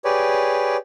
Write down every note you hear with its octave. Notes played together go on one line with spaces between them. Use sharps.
G4 G#4 B4 C#5 D5